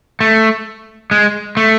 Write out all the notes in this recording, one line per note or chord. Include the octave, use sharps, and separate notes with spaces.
A3
G#3
A3